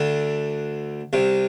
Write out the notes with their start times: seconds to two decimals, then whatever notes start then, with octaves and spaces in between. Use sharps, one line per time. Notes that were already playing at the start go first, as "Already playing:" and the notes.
Already playing: D2 D3
1.13 C2 C3